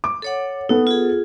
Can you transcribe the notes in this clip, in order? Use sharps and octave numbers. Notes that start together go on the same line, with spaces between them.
D6
A4 C#5 F#5
B3 D#4 A4
F4 G#4